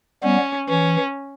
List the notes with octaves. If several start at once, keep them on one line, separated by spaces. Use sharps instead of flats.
G3 B3 C#4
E3 C#4